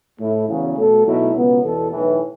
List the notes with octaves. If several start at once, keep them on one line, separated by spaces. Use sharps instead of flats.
A2 A3 E4
E2 C#3 F#3
B2 A3 F#4 A4
B1 B2 F#3 A3 E4
C#2 B2 F#3 B3
E2 B2 B3 A4
B1 A2 E3